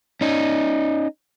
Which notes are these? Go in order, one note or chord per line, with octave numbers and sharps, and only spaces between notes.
C#4 D#4